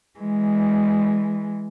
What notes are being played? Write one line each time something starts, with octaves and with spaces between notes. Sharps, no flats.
E3 G#3